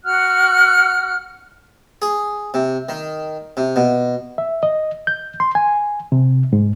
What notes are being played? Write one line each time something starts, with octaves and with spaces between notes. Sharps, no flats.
F#4 F#5 F6 F#6
G#4
C3
D#3
C3
B2
E5
D#5
G6
C6
G#5
C3
G#2